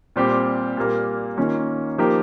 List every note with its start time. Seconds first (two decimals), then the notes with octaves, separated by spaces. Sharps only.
0.16 A#2 G3 C4 G4
0.77 A#2 G3 A#3
1.37 D#3 A#3 C#4 F4
1.98 F3 A#3 D#4 G4 A#4